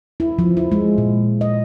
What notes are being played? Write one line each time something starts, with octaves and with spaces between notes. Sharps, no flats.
E4
F3
E4
G#3
A#2
D#5